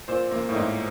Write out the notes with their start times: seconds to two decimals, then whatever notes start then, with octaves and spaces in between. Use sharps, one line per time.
0.08 A#2 C5
0.32 A#3
0.49 A2
0.56 G#2 D#4